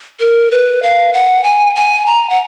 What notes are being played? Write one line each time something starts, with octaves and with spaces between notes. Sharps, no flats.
A#4
B4
F5
F#5
G#5
G#5
A#5
F#5